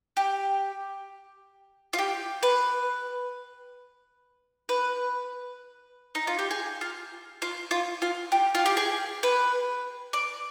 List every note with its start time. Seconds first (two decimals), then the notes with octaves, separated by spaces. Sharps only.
0.17 G4
1.93 F4
1.99 G4
2.43 B4
4.69 B4
6.15 D#4
6.27 F4
6.39 G4
6.51 G#4
6.81 F4
7.42 F4
7.71 F4
8.02 F4
8.32 G4
8.55 F4
8.66 G4
8.77 G#4
9.23 B4
10.13 D5